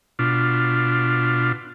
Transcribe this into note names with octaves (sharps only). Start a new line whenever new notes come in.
B2 D4 F4